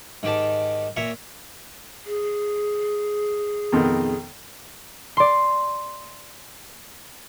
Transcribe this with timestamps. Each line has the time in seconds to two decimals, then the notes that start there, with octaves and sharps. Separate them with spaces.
0.23 G#2 D#3 G4 A5
0.97 A#2 C#5 E5 A#5
2.05 G#4
3.72 F2 B2 D#3
5.17 D5 C6